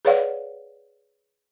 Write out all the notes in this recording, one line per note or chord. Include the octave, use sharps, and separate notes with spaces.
G#4 B4 C#5 D5 F5 F#5